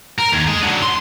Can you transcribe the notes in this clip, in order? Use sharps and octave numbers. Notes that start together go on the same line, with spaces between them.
A#4
D#2
G#4 D#5
D3 F#3
C6